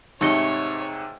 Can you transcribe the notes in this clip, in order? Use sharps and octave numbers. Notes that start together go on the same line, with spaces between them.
G#2 C3 A3 D#4 C#5 D#5 C#7 G7